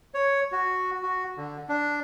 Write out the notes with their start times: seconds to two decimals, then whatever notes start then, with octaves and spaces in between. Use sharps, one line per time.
0.14 C#5
0.52 F#4
1.03 F#4
1.37 D3
1.69 D4